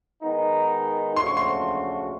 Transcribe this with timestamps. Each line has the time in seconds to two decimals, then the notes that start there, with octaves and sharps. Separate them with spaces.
0.22 D#3 G#3 B3 D#4
1.16 C#3 F3 A3 D4 F#4 C6
1.27 C#6
1.37 C6